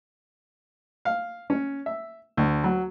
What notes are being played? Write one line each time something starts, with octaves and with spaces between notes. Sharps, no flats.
F5
C#4
E5
D2
F#3